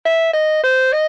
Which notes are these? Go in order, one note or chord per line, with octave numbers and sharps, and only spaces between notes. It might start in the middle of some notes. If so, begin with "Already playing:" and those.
E5
D#5
C5
D#5